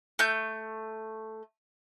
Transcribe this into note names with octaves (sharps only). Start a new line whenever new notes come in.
A3 G6